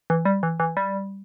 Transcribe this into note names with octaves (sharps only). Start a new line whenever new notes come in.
E3
G3
E3
E3
G3